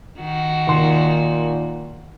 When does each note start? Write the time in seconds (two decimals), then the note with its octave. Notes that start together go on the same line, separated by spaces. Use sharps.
0.19 D#3 F#4
0.68 D#2 A#2 C6